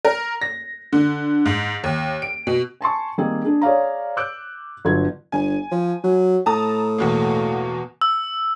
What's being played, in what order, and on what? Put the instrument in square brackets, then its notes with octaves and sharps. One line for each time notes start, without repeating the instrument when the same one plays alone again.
[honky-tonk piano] A#4
A#6
D3
G#2
D#2
D7
B2
[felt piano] G#5 A5 C6 C#6
D#3 G3 A#3 C4 G#4 D#5
D4 G#4
G#4 C#5 D5 F5 A#5
D6 E6 F#6 G6 D7
G1 F#3 B3 D4 G#6
[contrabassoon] G1 [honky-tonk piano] G#5
[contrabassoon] F3
F#3
[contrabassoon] A2 [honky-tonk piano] A5 A#5 D#6
[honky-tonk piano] E2 B2 A#3
[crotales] E6